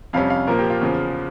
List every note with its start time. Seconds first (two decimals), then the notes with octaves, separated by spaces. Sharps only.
0.13 F2 C3 G3 C#4 F5
0.30 F5
0.47 A#2 F3 A#3 A#4
0.59 G4
0.70 F4
0.81 E2 C#3 F3